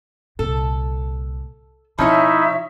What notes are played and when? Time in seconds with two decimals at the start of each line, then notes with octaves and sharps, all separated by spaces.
0.39 C2 A#2 A4
1.99 B2 F3 C#4 D#4 E4 C#5 E5